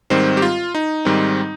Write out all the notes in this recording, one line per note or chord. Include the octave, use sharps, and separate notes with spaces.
G#2 D#3 G3 C4 C5
G4
F4
D#4
G#2 D#3 G3 C4